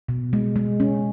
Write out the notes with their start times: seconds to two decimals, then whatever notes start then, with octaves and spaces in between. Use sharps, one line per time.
0.09 B2
0.33 G#3
0.56 G#3
0.80 C#4